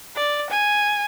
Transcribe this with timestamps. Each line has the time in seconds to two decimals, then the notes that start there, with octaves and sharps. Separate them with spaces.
0.16 D5
0.50 G#5